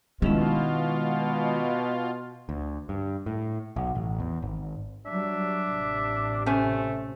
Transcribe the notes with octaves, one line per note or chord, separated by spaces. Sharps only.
B2 D#3 G#3 C#4 E4 F4
D2
G2
A2
B1
A1
E2
G#1
F#3 G3 D4 E5
A1 C3
A3 C#4 C5 G#5